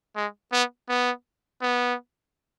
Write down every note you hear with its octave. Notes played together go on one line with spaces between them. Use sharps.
G#3
B3
B3
B3